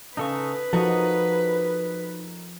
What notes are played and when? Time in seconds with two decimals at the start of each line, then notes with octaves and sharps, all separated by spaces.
0.17 C#3 D#4 A4 B4 C#6
0.73 F3 D#4 F#4 A4 A#4 D#5